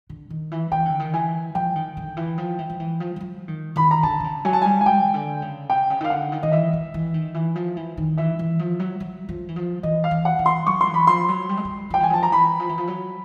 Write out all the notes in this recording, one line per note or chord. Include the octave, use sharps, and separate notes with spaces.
D3
D#3
E3
E3 G5
D3
D#3
E3 G#5
F3 G5
D#3
D3
E3
F3
E3
F3
E3
F3
F3
F#3
D#3
D#3 B5
A#5
D3 A5
D3
C#3
F#3 G#5
A5
G3 G#5
G#5
G#3 G5
C#3
D3
C#3
C3 G5
C#3
D#3 F5
D3 F#5
D#3
D#3 D#5
E3 E5
E3
E3
D#3
E3
F3
E3
D#3
E3 E5
E3
F3
F#3
F#3
F3
E3
F3
E3 D#5
F5
E3
F#5
E3
C6
F#3 C#6
C6
E3
B5
F3 C6
F#3
G3
G#3
G3
F3 G5
E3 G#5
F3 A5
A#5
E3 B5
F3
E3
F3
F#3